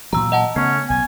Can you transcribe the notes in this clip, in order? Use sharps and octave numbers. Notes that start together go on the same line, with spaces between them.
A#2 E3 F#3 A#5 E6
D#5 F#5 A5
C#3 A3 B3 C#4
B1 G#5